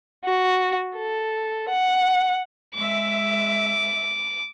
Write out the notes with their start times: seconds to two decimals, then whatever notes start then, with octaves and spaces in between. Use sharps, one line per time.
0.25 F#4
0.96 A4
1.70 F#5
2.75 G#3 E5 D6